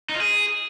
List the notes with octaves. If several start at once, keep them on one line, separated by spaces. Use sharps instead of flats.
D#4
F4
G#4